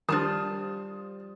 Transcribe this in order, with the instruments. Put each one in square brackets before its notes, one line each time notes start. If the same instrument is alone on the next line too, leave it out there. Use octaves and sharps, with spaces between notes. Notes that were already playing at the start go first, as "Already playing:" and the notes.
[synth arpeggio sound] D#3 D4 [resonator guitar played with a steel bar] F3 F4 A5 [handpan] G3 C5 [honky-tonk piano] D#6